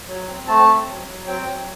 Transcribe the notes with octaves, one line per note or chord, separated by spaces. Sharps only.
F#3
C4
A3 A5
C4
F#3
F#3
C4 G5
F#3